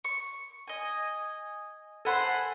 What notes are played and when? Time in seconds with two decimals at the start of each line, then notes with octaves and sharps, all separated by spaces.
0.04 C#6
0.68 D#5 G#5
2.05 A4 C5 F#5 G#5 B5